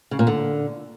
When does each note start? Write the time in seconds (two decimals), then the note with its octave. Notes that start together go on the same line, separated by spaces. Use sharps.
0.11 C#3
0.19 A#2
0.27 D3